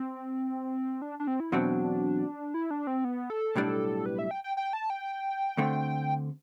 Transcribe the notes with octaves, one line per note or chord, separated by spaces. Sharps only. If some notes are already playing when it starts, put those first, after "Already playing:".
Already playing: C4
D4
D4
C4
E4
E2 B2 F#3 C4 D4
E4
D4
C4
B3
A4
B1 A2 G3 D4
B4
E5
G5
G5
G5
A5
G5
D2 D3 A3 C4